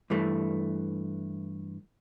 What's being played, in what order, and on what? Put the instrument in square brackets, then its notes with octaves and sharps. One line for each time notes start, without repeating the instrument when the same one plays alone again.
[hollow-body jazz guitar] G2 E3 A3